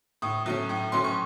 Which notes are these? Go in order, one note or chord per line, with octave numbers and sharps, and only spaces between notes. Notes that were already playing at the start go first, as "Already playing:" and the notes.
A2 D#6
F#3 A3 C#4
A2
F#3 A3 C#4 C6
C#6